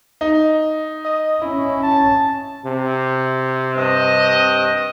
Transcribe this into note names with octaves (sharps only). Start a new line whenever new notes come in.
D#4
D#5
C#4 E4
A5
C3
G2 C4 D#5